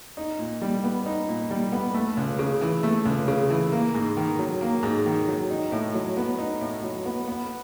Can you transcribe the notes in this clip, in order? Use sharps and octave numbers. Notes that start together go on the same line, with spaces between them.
D#4
A#2
G3
B3
D#4
A#2
G3
B3
A3
C#2
C#3
E3
A3
C#2
C#3
E3
A#3
G#2
D#3
F#3
A#3
G#2
D#3
F#3
D#4
A2
F#3
B3
D#4
A2
F#3
B3
B3